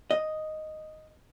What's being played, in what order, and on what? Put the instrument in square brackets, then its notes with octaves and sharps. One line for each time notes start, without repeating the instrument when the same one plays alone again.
[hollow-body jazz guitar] D#5